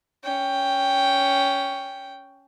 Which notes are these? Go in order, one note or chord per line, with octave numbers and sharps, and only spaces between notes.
C#4 G5